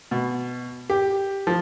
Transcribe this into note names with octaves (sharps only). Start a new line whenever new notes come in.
B2
G4
F3